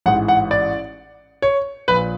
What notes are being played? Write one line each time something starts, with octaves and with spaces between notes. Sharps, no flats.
A1 G#2 E3 F#5
F#5
D5
C#5
A#1 A#2 B4